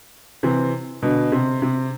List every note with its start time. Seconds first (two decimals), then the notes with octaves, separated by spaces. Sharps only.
0.43 C3 E3
1.02 B2 D3
1.32 C3
1.62 C3